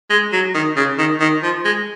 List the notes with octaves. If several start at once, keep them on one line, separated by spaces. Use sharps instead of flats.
G#3
F#3
D#3
C#3
D#3
D#3
F3
G#3